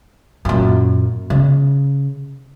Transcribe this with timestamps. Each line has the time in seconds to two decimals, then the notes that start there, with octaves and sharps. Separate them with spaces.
0.45 F#2 A#2
1.30 C#3